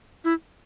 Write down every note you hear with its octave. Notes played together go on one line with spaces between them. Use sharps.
E4